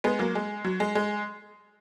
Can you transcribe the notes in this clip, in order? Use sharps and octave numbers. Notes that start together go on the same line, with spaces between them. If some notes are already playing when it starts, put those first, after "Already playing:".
G#3 B3
F#3 A#3
G#3
F#3
G#3
G#3